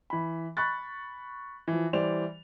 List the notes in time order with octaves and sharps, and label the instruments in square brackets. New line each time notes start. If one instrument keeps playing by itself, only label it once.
[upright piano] E3 B5
B5 C#6 F#6 A6
E3 F3
E3 G3 C5 D5 F7